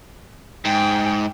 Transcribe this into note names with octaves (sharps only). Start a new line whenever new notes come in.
G#2 G#4 G5